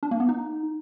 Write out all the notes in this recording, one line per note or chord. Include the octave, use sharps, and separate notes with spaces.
D4
A#3
B3
D#4